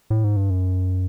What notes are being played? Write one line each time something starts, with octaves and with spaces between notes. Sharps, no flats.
A2
G#2
G2
F#2